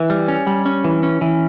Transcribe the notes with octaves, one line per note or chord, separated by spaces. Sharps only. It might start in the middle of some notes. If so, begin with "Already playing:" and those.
Already playing: E3
G3
C#4
G3
C#4
E3
C#4
E3